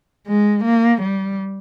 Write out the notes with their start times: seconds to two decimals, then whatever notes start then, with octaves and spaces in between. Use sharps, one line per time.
0.27 G#3
0.65 A#3
1.02 G3